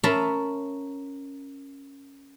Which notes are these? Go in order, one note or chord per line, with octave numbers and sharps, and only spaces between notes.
C#4 A#4 E5 A5 B5 C6